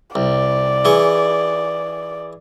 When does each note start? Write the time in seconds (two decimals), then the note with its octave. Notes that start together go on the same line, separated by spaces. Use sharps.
0.15 C2 D5
0.85 E3 G#4 C#6